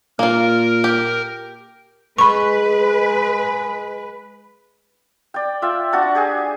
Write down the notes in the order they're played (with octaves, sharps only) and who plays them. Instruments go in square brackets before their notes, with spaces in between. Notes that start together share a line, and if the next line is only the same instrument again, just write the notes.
[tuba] A#2 [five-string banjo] A#3 F4 [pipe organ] A#4
[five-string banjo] G4
[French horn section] G#3 [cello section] B4 [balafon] B5 C#6
[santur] D5 G5
F4 E5 G5
D4 F#4 F#5 A5
G4 G#4 G#5